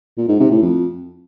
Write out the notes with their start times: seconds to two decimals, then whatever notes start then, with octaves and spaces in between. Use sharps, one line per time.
0.18 A#2
0.29 G#2
0.40 C3
0.51 A2
0.62 F2